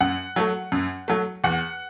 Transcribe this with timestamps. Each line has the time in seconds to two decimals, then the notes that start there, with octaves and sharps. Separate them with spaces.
0.01 F#2 F#5
0.36 F#3 A3
0.72 F#2
1.08 F#3 A3
1.44 E2 F#5